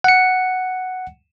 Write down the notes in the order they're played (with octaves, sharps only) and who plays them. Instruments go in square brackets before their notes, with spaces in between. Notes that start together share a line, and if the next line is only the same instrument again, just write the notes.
[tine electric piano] F#5 C#7